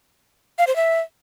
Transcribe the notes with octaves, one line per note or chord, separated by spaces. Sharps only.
F5
C5
E5